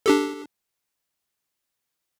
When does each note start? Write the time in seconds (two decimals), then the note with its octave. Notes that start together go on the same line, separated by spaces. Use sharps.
0.06 D4 G4 A4